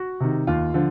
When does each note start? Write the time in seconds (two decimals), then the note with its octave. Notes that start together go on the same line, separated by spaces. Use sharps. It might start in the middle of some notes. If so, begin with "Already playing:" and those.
Already playing: F#4
0.20 C3 D#3
0.47 D#2 F4
0.74 D3 F3